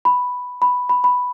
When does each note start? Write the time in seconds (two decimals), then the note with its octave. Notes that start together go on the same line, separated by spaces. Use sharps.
0.05 B5
0.62 B5
0.89 B5
1.04 B5